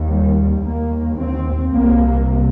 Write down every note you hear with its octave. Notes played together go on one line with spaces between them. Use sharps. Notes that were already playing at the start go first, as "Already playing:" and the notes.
Already playing: D#2
G3
D#2 A#3
C4
C2 C3 A#3